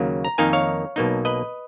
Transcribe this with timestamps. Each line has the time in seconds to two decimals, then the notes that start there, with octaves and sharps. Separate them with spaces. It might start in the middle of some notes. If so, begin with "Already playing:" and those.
Already playing: D#2 C#3 F#3 A#3
0.25 A#5
0.38 F2 D#3 A#3 D#4 F5 G#5
0.53 C#5 F5
0.96 B1 B2 A#3 D#4
1.25 B4 D#5